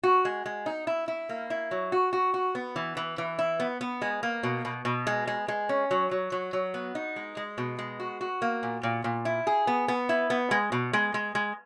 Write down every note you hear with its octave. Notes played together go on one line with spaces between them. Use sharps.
F#4
G#3
G#3
D#4
E4
E4
A#3
E4
F#3
F#4
F#4
F#4
B3
E3
E3
E3
E4
B3
B3
G#3
A#3
B2
B2
B2
G#3
G#3
G#3
C#4
F#3
F#3
F#3
F#3
B3
D#4
G#3
G#3
B2
G#3
F#4
F#4
A#3
A#2
A#2
A#2
E4
G#4
B3
B3
E4
B3
G#3
B2
G#3
G#3
G#3